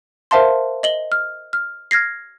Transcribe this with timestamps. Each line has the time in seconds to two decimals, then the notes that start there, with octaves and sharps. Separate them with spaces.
0.31 A#4 C5 E5 F5 A5 C6
0.83 D#5 F#7 G7
1.12 F6
1.53 F6
1.91 F6 G#6 A#6 C7